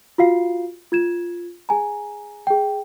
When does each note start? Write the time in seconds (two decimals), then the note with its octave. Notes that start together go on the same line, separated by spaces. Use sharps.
0.18 F4 F#4 F5 C7
0.92 F4 G#6 E7
1.69 G#4 G#5 A#5
2.47 G#4 G5